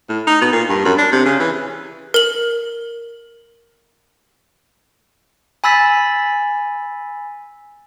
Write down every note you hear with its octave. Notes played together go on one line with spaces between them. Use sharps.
A2
D#4
B2
A#2
G2
F#2
D4
C3
C#3
E3
A#4 F#7
G#5 B5 E6 A6 B6